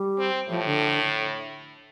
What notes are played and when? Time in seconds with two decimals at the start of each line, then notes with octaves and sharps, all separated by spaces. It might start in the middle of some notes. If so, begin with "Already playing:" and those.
Already playing: G3
0.18 C4
0.49 A2 F3
0.66 D3